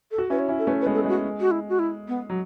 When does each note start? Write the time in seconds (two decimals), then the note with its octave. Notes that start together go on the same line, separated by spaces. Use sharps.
0.11 A4
0.18 F#4
0.30 C#4 E4 B4
0.39 C#5
0.49 C#4 E4
0.59 A4
0.67 A3 C#4 B4
0.81 B4
0.86 G#3 B3
0.95 A4
1.05 G#3 F#4
1.41 F#4
1.51 E4
1.69 F#4
1.79 E4
2.08 B3
2.30 F#3